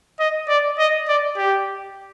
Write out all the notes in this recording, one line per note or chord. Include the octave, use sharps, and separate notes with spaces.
D#5
D5
D#5
D5
G4